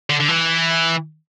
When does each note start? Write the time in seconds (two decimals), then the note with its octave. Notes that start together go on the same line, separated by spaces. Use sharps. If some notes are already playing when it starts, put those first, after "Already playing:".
0.10 D3
0.20 D3
0.28 E3